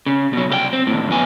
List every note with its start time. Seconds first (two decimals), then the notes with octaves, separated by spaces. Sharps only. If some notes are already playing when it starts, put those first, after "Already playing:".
0.06 C#3
0.33 B2 F#3
0.50 C2 G4 G5
0.73 C4
0.87 D#2 A2
1.07 B1 E2 B2 G#5